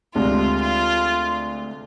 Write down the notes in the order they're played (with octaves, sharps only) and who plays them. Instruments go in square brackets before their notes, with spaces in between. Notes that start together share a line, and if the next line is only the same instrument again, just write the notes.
[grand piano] D2 C3 G#3 D4 [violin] F4
[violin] F4